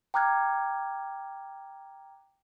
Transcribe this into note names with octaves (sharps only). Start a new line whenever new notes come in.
G5 A#5 D6 F6 F#6 G#6